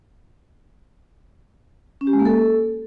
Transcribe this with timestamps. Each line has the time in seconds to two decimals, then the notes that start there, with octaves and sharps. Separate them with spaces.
2.01 C#4
2.07 G4
2.13 G#3
2.19 A#3
2.25 A4